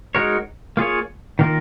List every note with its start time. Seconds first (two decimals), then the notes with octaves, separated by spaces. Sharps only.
0.15 G#3 D#4 F#4 A#4 C#5
0.77 A#3 F4 G#4 C#5
1.39 D#3 A#3 F4 A#4